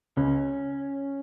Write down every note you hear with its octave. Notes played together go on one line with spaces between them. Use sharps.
C#2 C#4